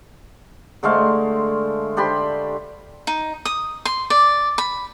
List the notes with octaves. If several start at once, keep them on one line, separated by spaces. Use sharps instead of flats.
D3 G#3 A3 F5
D4 G4 B5 C6
D#4
D#6
C6
D5
B5